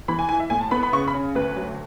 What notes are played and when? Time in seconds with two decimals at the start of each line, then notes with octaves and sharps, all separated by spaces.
0.08 E3 B5
0.19 G#5
0.29 E4 G#5
0.40 E5
0.50 A2 G#5
0.61 A5
0.71 B3 B5
0.83 B5
0.92 C#3 C#6
1.08 B5
1.14 C#4
1.35 D2 B4
1.56 F#3